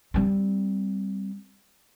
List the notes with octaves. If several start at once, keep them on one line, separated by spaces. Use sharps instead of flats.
G3 C4